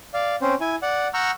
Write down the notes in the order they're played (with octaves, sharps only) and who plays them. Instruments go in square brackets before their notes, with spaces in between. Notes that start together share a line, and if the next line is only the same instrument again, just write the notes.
[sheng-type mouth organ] D5 F5
C4 C#4 C5
E4 G#5
D5 F#5
F#5 A#5 C#6 E6 F6 G6